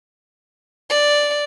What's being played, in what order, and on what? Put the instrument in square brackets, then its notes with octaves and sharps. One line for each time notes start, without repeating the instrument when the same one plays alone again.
[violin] D5